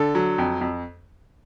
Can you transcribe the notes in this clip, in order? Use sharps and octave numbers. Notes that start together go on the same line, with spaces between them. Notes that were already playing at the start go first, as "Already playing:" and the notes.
Already playing: D3 A4
F#3
F2
F2